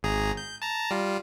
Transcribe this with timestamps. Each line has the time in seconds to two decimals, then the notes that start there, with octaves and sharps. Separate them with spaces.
0.03 G#1 G#4 A#5
0.37 G6
0.62 A5 A#5
0.91 G3 F4